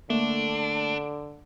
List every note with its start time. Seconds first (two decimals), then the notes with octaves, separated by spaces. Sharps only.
0.10 D3 A3 A#3 D4